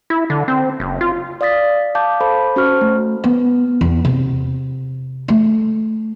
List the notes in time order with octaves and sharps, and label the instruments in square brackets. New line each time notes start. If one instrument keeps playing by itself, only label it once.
[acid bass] E4
D3
C4
F#1
F4
[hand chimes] D5 F5 D#6 A6 B6
F5 A5 D6 G6
A4 C5 A5 B5
C#4 F#4 C5 C#6 F6
A3
[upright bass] B3
E2
C3
A3